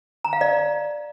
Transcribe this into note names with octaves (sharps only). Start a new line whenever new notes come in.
A#5
F5
D5